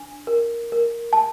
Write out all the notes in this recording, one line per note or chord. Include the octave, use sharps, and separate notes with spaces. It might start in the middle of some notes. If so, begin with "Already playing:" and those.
Already playing: D4
A#4
A#4
A5